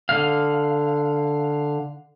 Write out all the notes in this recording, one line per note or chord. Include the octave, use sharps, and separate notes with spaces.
D3 F5